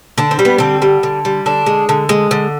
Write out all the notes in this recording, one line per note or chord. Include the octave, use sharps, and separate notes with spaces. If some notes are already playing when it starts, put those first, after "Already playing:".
D3 D4
C4
G3
B3
D3 C4
G3
D3
G3
D3 D4
G#3
D3
G#3
D3